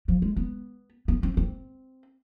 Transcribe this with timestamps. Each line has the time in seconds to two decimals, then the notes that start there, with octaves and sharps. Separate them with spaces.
0.08 F3
0.22 G#3
0.37 B3
1.08 B3
1.23 C4
1.37 C4